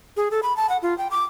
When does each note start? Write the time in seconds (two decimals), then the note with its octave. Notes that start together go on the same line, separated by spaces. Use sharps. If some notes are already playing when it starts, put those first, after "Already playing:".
0.17 G#4
0.31 A4
0.43 B5
0.57 A5
0.69 F#5
0.82 F4
0.98 G5
1.11 D6